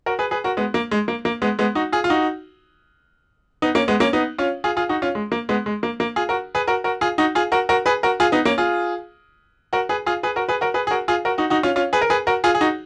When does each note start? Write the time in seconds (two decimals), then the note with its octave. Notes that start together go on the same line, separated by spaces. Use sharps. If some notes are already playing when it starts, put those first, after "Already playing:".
0.06 F#4 A#4
0.19 G#4 B4
0.31 G#4 B4
0.44 F#4 A#4
0.57 G#3 B3
0.74 A#3
0.91 G#3
1.08 A#3
1.25 A#3
1.42 G#3 B3
1.59 G#3 B3
1.75 D#4 F#4
1.92 F4 G#4
2.04 F4
2.10 D#4 F#4
3.62 B3 D#4
3.75 A#3 C#4
3.88 G#3 B3
4.00 A#3 C#4
4.13 B3 D#4
4.38 C#4 F4
4.64 F4 G#4
4.77 F4 G#4
4.89 D#4 F#4
5.02 C#4 F4
5.15 G#3
5.32 A#3
5.49 G#3 B3
5.66 G#3
5.83 A#3
6.00 A#3
6.16 F4 G#4
6.29 F#4 A#4
6.55 G#4 B4
6.67 F#4 A#4
6.84 F#4 A#4
7.01 F4 G#4
7.18 D#4 F#4
7.35 F4 G#4
7.52 F#4 A#4
7.69 F#4 A#4
7.86 G#4 B4
8.03 F#4 A#4
8.20 F4 G#4
8.32 B3 D#4
8.45 A#3 C#4
8.58 F4 G#4
9.73 F#4 A#4
9.89 G#4 B4
10.06 F4 G#4
10.23 G#4 B4
10.36 F#4 A#4
10.49 G#4 B4
10.61 F#4 A#4
10.74 G#4 B4
10.87 G#4
10.91 F#4 A#4
11.08 F4 G#4
11.25 F#4 A#4
11.38 D#4 F#4
11.50 D#4 F#4
11.63 C#4 F4
11.76 C#4 F4
11.93 G#4 B4
12.01 A#4
12.10 G#4 B4
12.27 F#4 A#4
12.44 F4 G#4
12.55 G#4
12.61 D#4 F#4